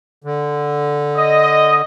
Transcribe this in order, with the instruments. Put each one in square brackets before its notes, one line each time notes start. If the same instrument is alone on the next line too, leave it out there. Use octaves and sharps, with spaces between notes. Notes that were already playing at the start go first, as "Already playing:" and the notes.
[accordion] D3
[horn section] D#5